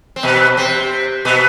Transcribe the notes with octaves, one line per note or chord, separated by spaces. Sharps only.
C4
B2 B3
C3 C4
B2 B3